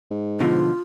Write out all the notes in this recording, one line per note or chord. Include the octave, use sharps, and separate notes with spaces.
G#2
B2 D3 F3 F4